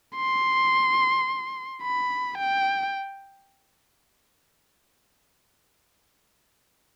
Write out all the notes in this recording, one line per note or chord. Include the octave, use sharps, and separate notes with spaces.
C6
B5
G5